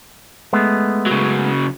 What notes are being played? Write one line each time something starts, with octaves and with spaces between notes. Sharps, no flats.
G#3 A3 B3
C#3 F#3